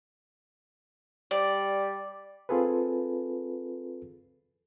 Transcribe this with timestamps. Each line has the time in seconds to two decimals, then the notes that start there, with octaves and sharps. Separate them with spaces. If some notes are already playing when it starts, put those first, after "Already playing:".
1.31 G3 D5
2.49 C4 F4 G#4 A4 B4